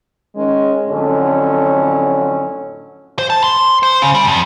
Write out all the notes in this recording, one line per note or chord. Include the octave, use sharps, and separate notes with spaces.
D#3 G#3 C#4
F2 A2 D3 F#3 C#4
C5
A5
C6
C5
C#3
G3
F2